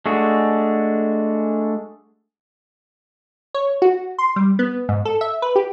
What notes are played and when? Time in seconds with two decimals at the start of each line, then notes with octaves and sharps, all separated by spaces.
0.06 G#3 A3 D4 F#4 G#4
3.54 C#5
3.82 F#4
4.18 C6
4.36 G3
4.59 B3
4.89 G#2
5.05 A4
5.21 E5
5.42 B4
5.56 G4